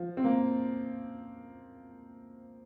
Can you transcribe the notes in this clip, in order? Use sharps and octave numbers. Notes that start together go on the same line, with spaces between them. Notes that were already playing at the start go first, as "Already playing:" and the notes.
Already playing: F3
C4
A#3